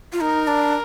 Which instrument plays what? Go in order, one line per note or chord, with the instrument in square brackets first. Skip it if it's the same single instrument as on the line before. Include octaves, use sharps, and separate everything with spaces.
[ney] F4
[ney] D#4 [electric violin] A#4
[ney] D4